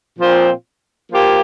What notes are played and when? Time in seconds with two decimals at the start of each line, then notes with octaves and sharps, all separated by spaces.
0.19 A#2 F3 C4 F4 C5
1.10 F3 A#3 G4